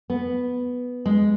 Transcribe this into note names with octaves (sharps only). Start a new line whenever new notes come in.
B3
G#3